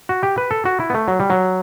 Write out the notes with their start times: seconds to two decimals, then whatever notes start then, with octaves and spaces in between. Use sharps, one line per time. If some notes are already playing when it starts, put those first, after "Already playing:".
0.09 F#4
0.23 G4
0.38 B4
0.51 A4
0.65 F#4
0.80 E4
0.90 B3
0.94 A3
1.08 F#3
1.20 G3
1.30 F#3